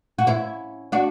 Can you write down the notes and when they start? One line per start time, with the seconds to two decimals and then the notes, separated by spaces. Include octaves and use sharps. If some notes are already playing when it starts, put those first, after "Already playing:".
0.19 F#4
0.27 C#4 E4
0.92 D4 F#4